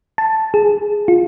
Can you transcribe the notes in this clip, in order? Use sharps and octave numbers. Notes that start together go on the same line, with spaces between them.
A5
G#4
F4